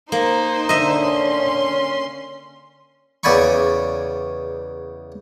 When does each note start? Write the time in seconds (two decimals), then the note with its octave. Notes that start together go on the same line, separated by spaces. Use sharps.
0.12 A#3 D#4 C5
0.69 D3 D#5 E5
1.03 C#4 C6
3.23 E2 C#3 D5 G#5 B5 C#6